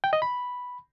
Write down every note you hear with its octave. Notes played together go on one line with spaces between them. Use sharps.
G5
D#5
B5